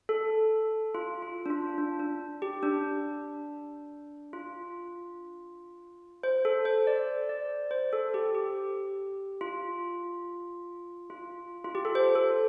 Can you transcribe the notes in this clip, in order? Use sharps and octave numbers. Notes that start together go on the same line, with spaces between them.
A4
F4
F4
D4
F4
D4
D4
G4
D4
F4
C5
A4
C5
D5
D5
C5
A4
G4
G4
F4
F4
F4
G4
A4
C5
A4